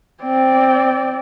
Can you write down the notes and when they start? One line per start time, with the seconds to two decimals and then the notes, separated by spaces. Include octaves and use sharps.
0.23 C4 D5